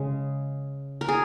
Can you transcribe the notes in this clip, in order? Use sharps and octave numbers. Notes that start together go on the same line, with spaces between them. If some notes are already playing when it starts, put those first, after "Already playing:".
Already playing: C#3 G#3
A#4
G#4